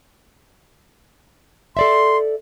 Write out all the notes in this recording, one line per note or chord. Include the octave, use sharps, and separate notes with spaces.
A4 D5 E5 C6